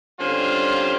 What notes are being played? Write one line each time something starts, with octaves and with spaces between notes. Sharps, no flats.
D3 G3 C4 C#4 F4